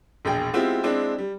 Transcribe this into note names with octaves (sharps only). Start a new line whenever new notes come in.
E1 A#1 G#4 G5
G#3 B3 C4 E4 F4 G4
G#3 C4 D4 E4
G3